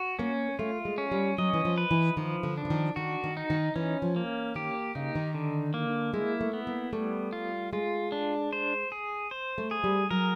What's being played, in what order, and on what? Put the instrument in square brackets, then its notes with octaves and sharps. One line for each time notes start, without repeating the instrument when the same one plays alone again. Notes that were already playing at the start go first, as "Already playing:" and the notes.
Already playing: [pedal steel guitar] F#4
[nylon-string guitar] A#3 [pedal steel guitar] C#4
[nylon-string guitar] A3 [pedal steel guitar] F4
[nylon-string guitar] G#3
[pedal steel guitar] C#4
[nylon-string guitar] G3
[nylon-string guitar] F#3 [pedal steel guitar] D#5
[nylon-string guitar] E3
F3
[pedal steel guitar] B4
[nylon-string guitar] E3
[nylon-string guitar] D#3 [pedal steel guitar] F3
[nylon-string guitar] D3
[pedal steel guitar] D4
[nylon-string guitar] D3
D#3
[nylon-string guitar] D#3 [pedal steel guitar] F#4
[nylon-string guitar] D#3
[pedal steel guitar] D#4
[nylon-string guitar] D#3
[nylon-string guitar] E3 [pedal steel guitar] C#4
[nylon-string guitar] F3
[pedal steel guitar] A#3
[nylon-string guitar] D#3 [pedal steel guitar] G4
[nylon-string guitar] C#3 [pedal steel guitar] D#4
[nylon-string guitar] D#3
[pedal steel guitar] D3
A#3
[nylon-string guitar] G#3 [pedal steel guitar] E4
[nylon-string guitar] A3
[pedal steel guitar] B3
[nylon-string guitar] A#3
[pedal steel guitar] G3 [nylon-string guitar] A3
[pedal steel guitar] F4
[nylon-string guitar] G#3 [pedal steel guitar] F4
[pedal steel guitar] D4
C5
G#4
C5
[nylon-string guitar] A3
[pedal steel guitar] G#4
[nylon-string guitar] G3
[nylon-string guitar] F#3 [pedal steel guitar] A#4